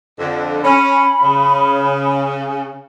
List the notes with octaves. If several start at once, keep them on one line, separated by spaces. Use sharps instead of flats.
F2 D3
C#4 B5
C#3